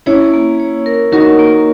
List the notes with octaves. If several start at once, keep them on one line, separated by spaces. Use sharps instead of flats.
C#4 E4 C#5
A#3
C#5
A#4
D#4 F#4 A#4
A#3